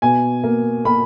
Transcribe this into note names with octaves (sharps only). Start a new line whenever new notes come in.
B2 G#5
A#3
A#3 B5